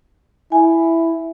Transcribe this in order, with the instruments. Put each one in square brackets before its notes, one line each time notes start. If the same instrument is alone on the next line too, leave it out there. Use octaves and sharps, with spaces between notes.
[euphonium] E4 [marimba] G#5